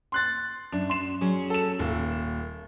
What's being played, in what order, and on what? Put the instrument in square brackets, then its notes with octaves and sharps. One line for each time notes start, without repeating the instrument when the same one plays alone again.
[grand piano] C6 F#6 A6
[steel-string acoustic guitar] F#2 [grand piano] D4
[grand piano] C6 E7
[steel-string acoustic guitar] F#3 C#4 G#4
[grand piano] A4 E7
[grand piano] D#1 [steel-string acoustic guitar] A#3